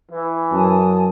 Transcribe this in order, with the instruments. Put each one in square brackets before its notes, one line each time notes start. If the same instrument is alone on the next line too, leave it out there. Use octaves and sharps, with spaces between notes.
[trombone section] E3
[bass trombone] F#2 [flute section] G#5 A5 D#6